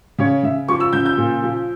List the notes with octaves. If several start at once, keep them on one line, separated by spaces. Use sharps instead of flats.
C#3 C#5
C#3 E5
F3 C#6
E6
C#3 G6
G6
A#2
F3